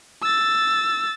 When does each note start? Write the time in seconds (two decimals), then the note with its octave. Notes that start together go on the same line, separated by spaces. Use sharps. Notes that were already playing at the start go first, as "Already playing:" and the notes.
0.22 E6 A6